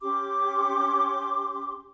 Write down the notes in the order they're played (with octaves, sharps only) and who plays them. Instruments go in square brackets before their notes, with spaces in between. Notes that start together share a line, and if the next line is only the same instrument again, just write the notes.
[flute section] C#4 G4 C6 D6